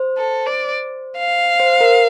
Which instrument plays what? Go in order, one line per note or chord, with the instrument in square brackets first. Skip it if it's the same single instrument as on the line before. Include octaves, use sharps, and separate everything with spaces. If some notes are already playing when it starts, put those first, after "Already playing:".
Already playing: [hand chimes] C5
[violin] A4
D5
F5
[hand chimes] C5
A#4